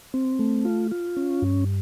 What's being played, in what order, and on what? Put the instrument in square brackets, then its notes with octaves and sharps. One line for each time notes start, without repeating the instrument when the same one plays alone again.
[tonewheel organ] C4
A3
F4
F4
C#4
G2